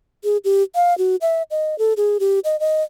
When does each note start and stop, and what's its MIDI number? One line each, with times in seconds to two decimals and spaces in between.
0.24 0.37 68
0.45 0.63 67
0.75 0.97 77
0.98 1.16 66
1.21 1.43 76
1.51 1.78 75
1.79 1.93 69
1.97 2.18 68
2.20 2.39 67
2.45 2.59 75
2.60 2.83 75